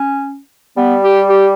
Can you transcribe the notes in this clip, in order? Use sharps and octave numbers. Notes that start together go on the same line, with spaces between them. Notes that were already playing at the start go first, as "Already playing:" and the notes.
Already playing: C#4
G3 B3
G4
G4